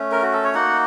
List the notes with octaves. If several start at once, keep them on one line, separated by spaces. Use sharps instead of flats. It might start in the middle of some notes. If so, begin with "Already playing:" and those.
Already playing: A3 C#4
A#4
F#4
A4
C#5
A#3 D#4 F#4 F#5